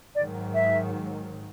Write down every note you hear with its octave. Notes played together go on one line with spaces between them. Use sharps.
G#2 D#3 F#3 D5
E5